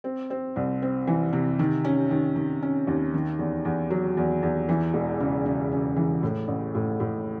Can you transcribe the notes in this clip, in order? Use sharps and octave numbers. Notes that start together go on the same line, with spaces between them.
C4
C4
C2
C4
E3
C3
D#3
C#4
D#3
D#3
C#4
D#2
D#3
E2
E2
F#3
E2
E2
E3
E1
C#3
C#3
C#3
E3
A2
A1
A2
A2